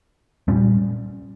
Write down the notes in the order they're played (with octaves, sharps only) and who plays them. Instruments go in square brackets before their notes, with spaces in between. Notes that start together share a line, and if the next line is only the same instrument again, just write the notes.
[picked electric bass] A#2 G3 C#4